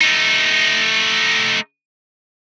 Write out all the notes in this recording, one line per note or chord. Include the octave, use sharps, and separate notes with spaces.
A3 D#4